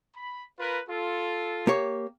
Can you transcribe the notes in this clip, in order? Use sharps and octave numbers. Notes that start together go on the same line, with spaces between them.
B5
F4 A#4 B4
F4 A4
A#3 G4 C#5